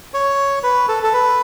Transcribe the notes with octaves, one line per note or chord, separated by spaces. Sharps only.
C#5
B4
A4
A4
B4